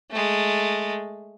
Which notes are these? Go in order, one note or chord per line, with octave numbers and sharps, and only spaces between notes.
G#3 A3